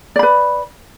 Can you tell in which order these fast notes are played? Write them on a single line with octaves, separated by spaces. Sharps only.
D5 B5 B4